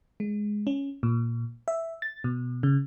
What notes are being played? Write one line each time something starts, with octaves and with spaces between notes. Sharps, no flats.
G#3
C#4
A#2
E5
A6
B2
C#3